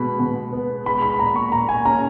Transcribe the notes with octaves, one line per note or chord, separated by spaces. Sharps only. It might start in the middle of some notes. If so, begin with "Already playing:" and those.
Already playing: B2 G#3 B5
B2
B3
G#3 B5
B5
B5
A#2 A#5
C#6
A#2 A#5
G#5
C#4 A#5